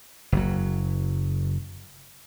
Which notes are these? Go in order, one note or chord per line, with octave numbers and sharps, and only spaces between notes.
F#1 F#3